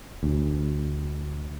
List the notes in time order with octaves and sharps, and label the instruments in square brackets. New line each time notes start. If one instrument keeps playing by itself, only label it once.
[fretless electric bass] D2